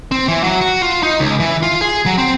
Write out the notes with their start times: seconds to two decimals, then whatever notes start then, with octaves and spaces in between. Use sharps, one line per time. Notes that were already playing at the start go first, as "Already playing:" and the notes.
0.12 C4
0.28 E3
0.44 F#3
0.61 F#4
0.82 F4
1.03 D#4
1.20 C#2
1.40 E3
1.63 F4
1.81 G#4
2.06 F#3
2.18 C4